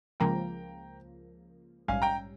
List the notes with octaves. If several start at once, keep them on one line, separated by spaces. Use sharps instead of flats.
C#2 C#3 F3 A#3 G5 A#5
A#1 G#2 G3 C#4 F5 G#5
G5 A#5